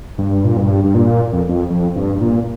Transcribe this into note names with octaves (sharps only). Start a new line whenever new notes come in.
G2
A#2
G2
G2
A#2
F2
F2
F2
G2
G2
A#2